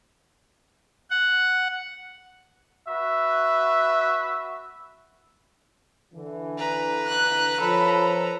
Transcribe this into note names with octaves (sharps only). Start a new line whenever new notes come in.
F#5
F#4 B4 E5
D3 E3
B4 A#5
F#6
F3 A4 C#5 B5